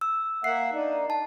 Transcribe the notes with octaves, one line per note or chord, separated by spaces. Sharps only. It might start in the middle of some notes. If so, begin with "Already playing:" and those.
E6
A#3 E5 F#5 C7
D4 D#4
A5